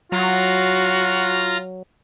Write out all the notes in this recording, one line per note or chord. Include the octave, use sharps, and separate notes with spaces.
F#3 F4 F#4 F5 A#5